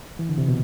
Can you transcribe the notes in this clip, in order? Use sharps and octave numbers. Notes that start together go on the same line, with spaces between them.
E3
D3
C3
B2